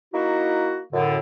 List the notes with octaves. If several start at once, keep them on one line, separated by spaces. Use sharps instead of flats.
A#3 D#4 E4 F#4
F#2 A2 D3